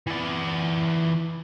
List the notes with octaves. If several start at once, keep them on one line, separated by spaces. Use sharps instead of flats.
E3 D5